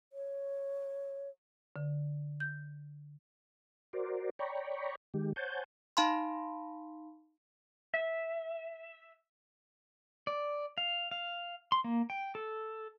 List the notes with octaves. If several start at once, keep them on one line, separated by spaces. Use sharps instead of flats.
C#5
D3
G6
F#4 A#4 C5 D5
C#5 D5 G5 A#5 B5 C#6
D#3 G#3 G4
C5 C#5 F#5 G#5 A5 G6
D#4 F5 A5 B5 C6
E5
D5
F5
F5
C6
A#3
G5
A4